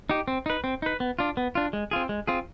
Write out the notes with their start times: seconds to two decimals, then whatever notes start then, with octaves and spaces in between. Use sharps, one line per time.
0.10 D#4 G4
0.28 C4
0.46 D#4 B4
0.64 C4
0.82 D#4 B4
1.00 B3
1.19 D4 F4
1.37 B3
1.55 D4 F4
1.73 G#3
1.91 C4 F4 G#4
2.09 G#3
2.27 C4 F4 G#4